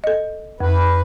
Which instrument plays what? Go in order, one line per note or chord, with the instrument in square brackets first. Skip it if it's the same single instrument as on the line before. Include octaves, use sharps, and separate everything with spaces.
[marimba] A4 D#5
[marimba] F2 [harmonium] B4